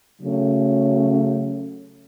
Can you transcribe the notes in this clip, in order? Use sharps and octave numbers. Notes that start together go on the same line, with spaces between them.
C#3 F#3 A3 C#4